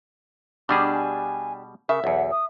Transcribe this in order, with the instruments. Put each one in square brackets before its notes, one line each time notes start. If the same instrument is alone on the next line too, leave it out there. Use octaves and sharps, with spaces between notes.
[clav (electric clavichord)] B2 G3 G#4 [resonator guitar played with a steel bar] D4 G4 [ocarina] D6
[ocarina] G#5
[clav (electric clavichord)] C#3 [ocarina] A#4 [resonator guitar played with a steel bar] E5
[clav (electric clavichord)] B1 E2 [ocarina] F#5
[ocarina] D#6